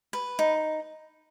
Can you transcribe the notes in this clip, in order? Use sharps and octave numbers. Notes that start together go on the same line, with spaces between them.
B4
D#4